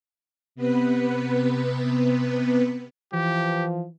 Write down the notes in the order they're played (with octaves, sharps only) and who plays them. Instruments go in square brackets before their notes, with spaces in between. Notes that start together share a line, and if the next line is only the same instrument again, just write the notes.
[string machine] C3 B3 B4
[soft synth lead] E3 [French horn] F3 [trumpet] G4